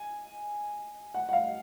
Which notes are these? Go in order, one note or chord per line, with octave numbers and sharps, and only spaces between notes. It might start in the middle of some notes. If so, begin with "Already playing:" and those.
Already playing: G#5
F#5
F#5
F5